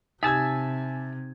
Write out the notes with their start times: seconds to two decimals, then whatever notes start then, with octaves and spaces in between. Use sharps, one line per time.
0.23 C3 D#4 G4 E5 G#5 A5 E6 G#6